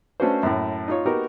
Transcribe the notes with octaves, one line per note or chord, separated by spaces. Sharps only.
A3 C#4 D4 F#4 B4 C5
F#2 A2
D#4 F4 C#5
B3 D#4 F#4 G4 A#4